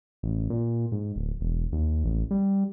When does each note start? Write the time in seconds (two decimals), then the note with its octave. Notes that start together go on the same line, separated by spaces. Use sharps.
0.23 A1
0.50 A#2
0.92 G#2
1.16 D1
1.41 E1
1.72 D#2
2.04 A1
2.31 G3